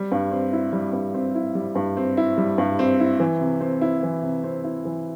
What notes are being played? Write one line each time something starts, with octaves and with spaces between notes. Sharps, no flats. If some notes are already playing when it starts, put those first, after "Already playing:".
Already playing: G3
G2
C4
E4
G3
G2
C4
E4
G3
G2
C4
E4
G3
G2
C4
E4
E3
C3
C4
E4
E3
C3
C4
E4
E3